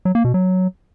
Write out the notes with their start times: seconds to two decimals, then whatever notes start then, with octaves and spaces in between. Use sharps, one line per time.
0.05 F#3
0.15 A#3
0.24 B2
0.34 F#3